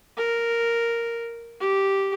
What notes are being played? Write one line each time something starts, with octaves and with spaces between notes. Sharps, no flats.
A#4
G4